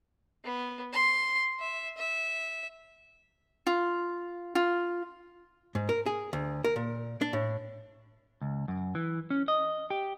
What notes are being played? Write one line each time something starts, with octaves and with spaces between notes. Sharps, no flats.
B3
C6
E5
E5
F4
F4
G#2
A#4
G#4
D2
A#4
A#2
D4
A2
C#2
F#2
E3
C#4
D#5
G4